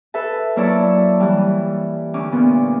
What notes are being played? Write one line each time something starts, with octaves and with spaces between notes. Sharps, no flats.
A4 B4 E5 A5
F#3 A#3 E4 C#5 D5 A5
E3 G3
D2 C#4 D6
A#2 B3